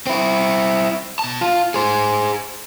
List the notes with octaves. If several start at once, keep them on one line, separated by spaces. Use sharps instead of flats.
C4 E4
B2 A5
F4
G#4 C5